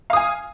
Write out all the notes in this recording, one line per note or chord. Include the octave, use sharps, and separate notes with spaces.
F5 G#5 D#6